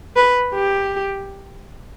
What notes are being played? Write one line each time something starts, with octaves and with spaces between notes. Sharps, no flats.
B4
G4